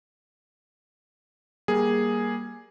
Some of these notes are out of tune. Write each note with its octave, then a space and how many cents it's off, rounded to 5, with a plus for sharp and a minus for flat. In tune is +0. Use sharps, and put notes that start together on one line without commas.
G3 -15 A#3 +10 G#4 +0